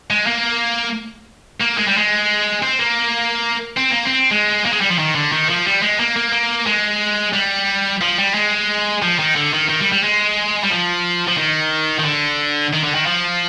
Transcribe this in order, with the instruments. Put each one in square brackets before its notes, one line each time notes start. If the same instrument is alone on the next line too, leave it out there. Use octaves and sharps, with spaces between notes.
[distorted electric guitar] G#3
A#3
A#3
G#3
G3
G#3
C4
A#3
C4
A#3
C4
G#3
A#3
G#3
G3
F3
D#3
D3
D#3
F3
G3
G#3
A#3
A#3
A#3
G#3
G3
F3
G3
G#3
F3
D#3
D3
D#3
D#3
G3
G3
G#3
G3
F3
F3
D#3
D#3
D3
D#3
D3
D#3
F3